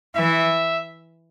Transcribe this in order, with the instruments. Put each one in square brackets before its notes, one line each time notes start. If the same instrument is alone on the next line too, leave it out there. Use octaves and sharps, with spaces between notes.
[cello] E3 [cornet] E5